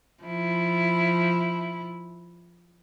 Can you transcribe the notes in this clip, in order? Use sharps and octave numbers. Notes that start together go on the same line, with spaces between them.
F3 E4